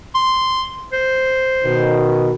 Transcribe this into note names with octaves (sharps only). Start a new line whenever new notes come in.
C6
C5
B2 D#3